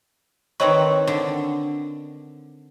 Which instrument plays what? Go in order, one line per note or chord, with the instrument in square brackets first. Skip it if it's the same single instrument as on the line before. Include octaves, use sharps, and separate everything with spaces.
[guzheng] D#3 C4 B4 [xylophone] C#5 D#5 C#6
[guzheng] D3